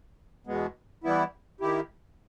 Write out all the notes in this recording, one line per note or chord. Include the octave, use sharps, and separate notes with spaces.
E2 B2 G#3 B3
E3 G3 B3 E4
D#3 A#3 E4 G4